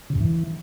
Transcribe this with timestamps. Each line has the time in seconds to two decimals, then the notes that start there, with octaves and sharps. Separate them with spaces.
0.10 C#3
0.15 F#2
0.20 E3